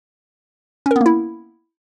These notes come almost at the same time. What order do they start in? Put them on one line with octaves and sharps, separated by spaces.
C#4 A#4 B3 A#3 E4